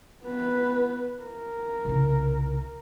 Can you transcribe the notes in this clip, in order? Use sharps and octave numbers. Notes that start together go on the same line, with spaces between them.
B3 B4
A#4
C2 C#3